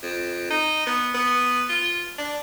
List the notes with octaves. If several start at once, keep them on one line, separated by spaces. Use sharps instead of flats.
F2
D#4
B3
B3
F4
D4